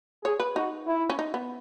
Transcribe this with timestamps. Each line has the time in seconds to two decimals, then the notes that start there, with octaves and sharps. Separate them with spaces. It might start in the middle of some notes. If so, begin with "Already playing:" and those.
0.24 G#4 C#5
0.40 B4
0.56 D#4 F#4
0.87 E4
1.10 C#4
1.19 D#4
1.34 B3